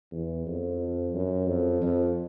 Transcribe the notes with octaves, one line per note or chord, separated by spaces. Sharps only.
E2
F2
F#2
F2
F2